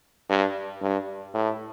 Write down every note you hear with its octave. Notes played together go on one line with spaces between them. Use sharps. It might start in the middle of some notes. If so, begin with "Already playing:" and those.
G2
G2
A2